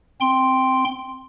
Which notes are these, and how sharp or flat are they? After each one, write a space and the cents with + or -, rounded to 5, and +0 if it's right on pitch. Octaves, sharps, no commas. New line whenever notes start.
C4 +0 G5 +0 C6 +0